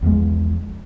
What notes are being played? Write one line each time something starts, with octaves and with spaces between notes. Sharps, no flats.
B1 E2 F3 G#3